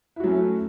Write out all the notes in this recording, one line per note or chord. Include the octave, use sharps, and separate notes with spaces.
F#3 A3 C#4 E4 F#4